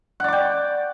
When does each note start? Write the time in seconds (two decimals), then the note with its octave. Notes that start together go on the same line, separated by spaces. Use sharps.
0.20 F#5
0.24 D5
0.28 D6
0.33 G5